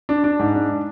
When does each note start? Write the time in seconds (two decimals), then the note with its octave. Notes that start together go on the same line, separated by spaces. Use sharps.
0.09 D4
0.24 D4
0.39 G#2
0.55 D4